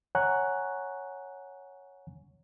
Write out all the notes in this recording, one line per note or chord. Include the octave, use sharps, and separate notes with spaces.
C#5 F#5 G#5 A#5 C#6 F#6